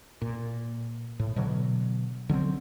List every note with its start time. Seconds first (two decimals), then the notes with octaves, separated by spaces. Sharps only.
0.22 A#2
1.19 A2
1.36 B2 D3 F#3
2.29 D3 F#3 G#3 C4